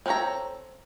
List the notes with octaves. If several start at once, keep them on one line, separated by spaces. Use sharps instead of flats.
C4 A4 A#4 C#5 A#5